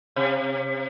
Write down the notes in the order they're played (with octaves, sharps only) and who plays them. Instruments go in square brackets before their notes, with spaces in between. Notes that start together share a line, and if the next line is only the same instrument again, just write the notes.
[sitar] C3